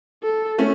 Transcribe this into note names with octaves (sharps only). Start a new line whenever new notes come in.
A4
A3 C#4